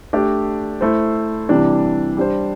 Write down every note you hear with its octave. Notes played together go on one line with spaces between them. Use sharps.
A3 D4 G4 D5
A3 E4 C5
C3 E3 G3 D4
G3 D4 C5